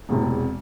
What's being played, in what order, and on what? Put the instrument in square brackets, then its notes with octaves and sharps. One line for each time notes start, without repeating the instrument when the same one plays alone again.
[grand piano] E1 E2 C3